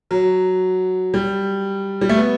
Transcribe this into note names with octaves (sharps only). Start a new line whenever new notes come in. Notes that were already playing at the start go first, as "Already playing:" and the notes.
F#3
G3
G3
A3
B3